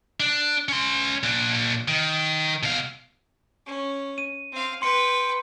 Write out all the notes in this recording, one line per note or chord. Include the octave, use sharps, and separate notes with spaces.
D4
C#4 C6
A#2 D4
D#3
B2 F5
C#4
D#7
C4 F5
B4 G5 C6 C#7